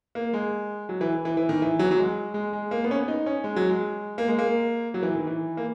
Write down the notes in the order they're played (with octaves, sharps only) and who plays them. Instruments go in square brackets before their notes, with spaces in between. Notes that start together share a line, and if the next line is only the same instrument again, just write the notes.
[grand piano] A#3
G#3
F#3
E3
E3
E3
D#3
E3
F#3
F#3
G#3
G#3
G#3
A#3
B3
C#4
B3
D#4
C#4
G#3
F#3
G#3
A#3
G#3
A#3
F#3
E3
D#3
E3
A#3